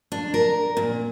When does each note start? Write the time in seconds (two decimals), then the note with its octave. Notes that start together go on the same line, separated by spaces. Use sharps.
0.12 D4
0.34 A#4
0.77 A#2